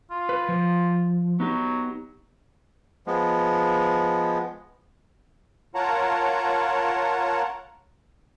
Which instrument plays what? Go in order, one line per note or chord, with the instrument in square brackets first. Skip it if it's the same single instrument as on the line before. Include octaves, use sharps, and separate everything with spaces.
[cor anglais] F4
[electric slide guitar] B4
F3
[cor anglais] F#3 [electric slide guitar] B3 D#4 G4
[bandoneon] F3 G#3 B3
[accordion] F4 A#4 C#5 F#5 A5 A#5